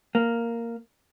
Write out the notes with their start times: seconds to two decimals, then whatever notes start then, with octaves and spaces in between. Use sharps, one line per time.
0.15 A#3